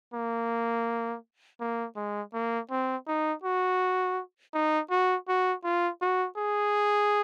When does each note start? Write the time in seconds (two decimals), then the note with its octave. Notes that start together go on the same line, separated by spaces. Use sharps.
0.14 A#3
1.60 A#3
1.96 G#3
2.34 A#3
2.71 C4
3.08 D#4
3.44 F#4
4.54 D#4
4.90 F#4
5.28 F#4
5.64 F4
6.02 F#4
6.37 G#4